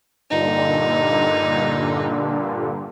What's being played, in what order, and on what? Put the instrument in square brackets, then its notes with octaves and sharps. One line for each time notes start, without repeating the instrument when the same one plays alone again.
[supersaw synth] G2 A#2 D3 [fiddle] D#4